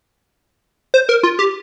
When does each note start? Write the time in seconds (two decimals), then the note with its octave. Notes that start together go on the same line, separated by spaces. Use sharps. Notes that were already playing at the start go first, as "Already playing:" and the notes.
0.94 C5
1.09 A#4
1.23 F4
1.39 G4